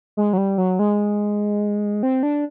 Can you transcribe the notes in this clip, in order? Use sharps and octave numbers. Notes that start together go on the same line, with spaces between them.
G#3
F#3
G3
F#3
G#3
C4
D4